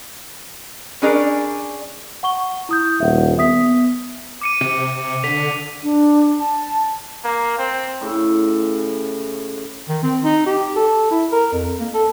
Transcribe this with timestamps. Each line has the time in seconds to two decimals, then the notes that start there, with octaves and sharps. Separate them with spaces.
1.02 G3 C#4 D4 G#4 A#4 D5
2.23 F#5 C#6 G7
2.69 E4 D#6 G6
3.00 D#1 E5 F#5
3.38 B3 E5 D#6 B6
4.41 D6 C#7 D#7
4.61 C3
5.23 D3 B6 F7
5.83 D4
6.40 A5
7.25 A#3
7.58 C4
8.01 A2 C#3
9.89 D#3
10.03 C4
10.24 D#4
10.46 G4
10.76 A4
11.11 E4
11.32 A#4
11.52 F2
11.80 A#3
11.94 A4